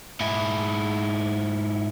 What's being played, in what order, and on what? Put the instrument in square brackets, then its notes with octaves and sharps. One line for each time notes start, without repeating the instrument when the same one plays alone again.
[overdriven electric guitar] G#2 E4